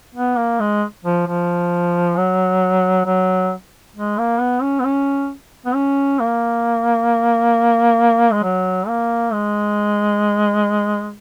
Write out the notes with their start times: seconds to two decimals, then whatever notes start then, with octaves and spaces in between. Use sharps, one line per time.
0.15 B3
0.37 A#3
0.60 G#3
1.05 F3
1.27 F3
2.17 F#3
3.06 F#3
3.96 G#3
4.18 A#3
4.40 B3
4.62 C#4
4.80 B3
4.85 C#4
5.66 B3
5.75 C#4
6.20 A#3
8.32 G#3
8.43 F#3
8.88 A#3
9.33 G#3